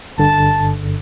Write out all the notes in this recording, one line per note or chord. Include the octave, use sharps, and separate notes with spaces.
G1 G2 D3 A5